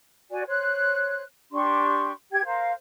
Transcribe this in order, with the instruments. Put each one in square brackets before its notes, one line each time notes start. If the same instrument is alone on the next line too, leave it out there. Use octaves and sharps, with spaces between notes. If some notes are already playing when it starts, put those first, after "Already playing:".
[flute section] F#4 D5 G#5
C5 C#5 F#6
D4 G4 C6 C#6
G4 G5 G#6
A#4 C5 F5